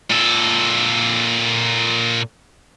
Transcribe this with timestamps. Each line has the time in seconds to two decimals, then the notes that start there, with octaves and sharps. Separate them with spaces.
0.10 A#2 A4